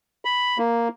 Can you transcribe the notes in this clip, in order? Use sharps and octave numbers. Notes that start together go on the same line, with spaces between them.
B5
A#3